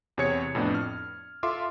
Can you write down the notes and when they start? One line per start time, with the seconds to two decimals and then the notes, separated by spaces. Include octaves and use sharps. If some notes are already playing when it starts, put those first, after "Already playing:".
0.17 E2 C3 G#4 C#5 G#6 C#7
0.55 F2 A2 B3 D4
0.75 F6
1.43 F4 A4 E5 F5 C6 D6